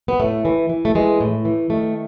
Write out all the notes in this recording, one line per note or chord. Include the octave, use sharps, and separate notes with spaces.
B3
A2 A3
E3
E3
A3
E3 G#3
A2
E3
D#3 A3